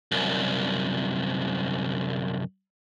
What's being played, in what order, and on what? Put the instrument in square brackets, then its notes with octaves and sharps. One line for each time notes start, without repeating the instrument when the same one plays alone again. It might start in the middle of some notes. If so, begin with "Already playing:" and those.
[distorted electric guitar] C2 F#2